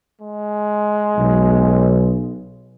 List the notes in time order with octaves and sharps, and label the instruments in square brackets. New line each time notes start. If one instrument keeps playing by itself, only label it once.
[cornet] G#3
[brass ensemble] B1